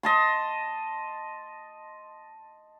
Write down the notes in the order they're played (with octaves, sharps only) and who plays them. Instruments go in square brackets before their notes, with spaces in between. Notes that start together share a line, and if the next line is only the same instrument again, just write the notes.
[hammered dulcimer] D#5 A5 C6